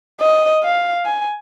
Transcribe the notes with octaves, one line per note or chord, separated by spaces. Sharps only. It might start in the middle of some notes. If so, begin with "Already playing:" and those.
D#5
F5
G#5